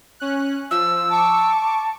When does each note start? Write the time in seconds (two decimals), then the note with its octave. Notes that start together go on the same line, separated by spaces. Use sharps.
0.20 C#4 F#6
0.71 F3 E6
1.11 A5 C#6 D6